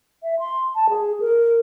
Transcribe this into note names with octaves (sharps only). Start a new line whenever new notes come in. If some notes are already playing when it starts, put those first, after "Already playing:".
E5
C6
A5
G#4
A#4